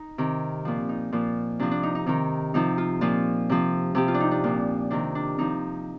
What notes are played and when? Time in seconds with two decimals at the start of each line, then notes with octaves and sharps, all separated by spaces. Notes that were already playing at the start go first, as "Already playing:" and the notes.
Already playing: D#4
0.18 C3 D#3
0.65 A#2 F3
0.89 D#4
1.13 A#2 F3
1.59 C3 F3 D4
1.71 D4
1.83 D#4
1.95 D#4
2.06 C3 D#3 D#4
2.54 C3 F3 D#4
2.78 F4
3.01 A#2 F3 F4
3.50 C3 F3
3.95 C3 F3 G4
4.08 F4
4.14 D4
4.20 D#4
4.31 D4
4.44 A#2 F3
4.91 C3 D#3 D4
5.15 D4
5.38 C3 F3 D#4